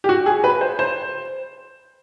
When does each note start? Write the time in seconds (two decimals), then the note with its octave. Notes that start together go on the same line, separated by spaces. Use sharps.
0.04 G4
0.09 F#4
0.26 G#4
0.44 B4
0.61 C5
0.79 C5